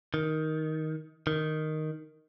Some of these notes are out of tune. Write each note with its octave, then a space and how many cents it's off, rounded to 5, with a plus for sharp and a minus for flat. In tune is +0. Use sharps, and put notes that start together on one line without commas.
D#3 +10
D#3 -5